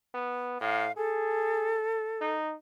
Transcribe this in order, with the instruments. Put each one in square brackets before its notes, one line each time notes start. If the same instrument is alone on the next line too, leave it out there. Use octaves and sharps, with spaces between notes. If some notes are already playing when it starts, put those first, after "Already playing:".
[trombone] B3
[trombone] A2 [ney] F5
[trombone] G#4 [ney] A4
[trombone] D#4